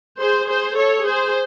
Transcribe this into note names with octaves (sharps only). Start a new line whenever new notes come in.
G#4 C5
G#4 C5
A4 C#5
G#4 C5